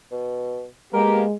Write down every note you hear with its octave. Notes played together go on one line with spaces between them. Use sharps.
B2
G#3 A#3 B3 G4 A#4